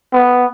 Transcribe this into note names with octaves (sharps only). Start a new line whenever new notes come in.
B3